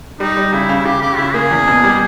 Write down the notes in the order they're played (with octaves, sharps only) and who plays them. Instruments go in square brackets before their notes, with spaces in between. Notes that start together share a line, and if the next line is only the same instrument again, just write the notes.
[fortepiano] G3 [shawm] D#4
[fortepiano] G3
[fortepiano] C#3 [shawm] E4
[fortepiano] C#3
[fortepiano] C#3 [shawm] G4
[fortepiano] C#3 [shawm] G4
[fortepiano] C#3 [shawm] E4
[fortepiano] A#3 [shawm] G#4
[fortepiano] E2
B2
G3